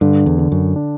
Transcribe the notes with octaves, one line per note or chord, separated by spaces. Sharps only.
G2 D3
E2
D3
F#2
D4